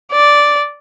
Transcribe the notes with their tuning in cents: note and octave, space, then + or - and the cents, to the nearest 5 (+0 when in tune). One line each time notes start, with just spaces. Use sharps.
D5 -5